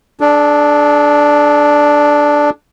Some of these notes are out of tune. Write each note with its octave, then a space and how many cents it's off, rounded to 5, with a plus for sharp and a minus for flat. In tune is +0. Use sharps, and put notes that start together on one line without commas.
D4 +0 G#4 +45